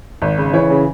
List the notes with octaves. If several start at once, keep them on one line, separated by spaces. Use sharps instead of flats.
G#1
C#3
E3 C#5
C#3